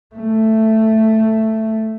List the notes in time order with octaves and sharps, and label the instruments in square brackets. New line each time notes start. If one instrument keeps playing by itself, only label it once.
[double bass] A3